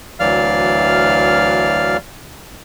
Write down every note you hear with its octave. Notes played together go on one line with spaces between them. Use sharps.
D2 E3 F#3 D5 F5 F6